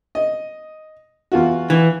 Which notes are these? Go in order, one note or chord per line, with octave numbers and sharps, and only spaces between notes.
D#5
E2 F4 F#4
E3